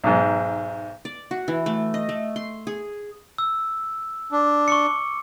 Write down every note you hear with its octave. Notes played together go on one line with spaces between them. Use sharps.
B1 G#2
D5
F#4
E3
A3
D#5
A3
C6
G#4
E6
D4
C#6 D6 C#7